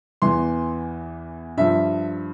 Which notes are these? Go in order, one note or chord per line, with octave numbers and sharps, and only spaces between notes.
E2 E3 C6
G2 F3 E5